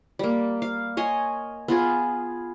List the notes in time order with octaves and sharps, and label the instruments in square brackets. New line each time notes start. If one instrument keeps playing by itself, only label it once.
[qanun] G3 A#3
F5
C#5 D#5 G#5 C6
B3 F4 G#4